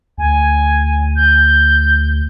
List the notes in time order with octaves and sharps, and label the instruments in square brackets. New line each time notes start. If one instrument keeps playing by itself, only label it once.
[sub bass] D2 [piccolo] G#5
[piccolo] G6